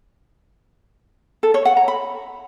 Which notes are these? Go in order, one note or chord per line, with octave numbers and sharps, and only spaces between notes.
A4
C#5
F#5
A#5
B5